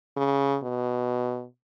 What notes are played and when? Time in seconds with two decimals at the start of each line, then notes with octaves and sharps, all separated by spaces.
0.17 C#3
0.63 B2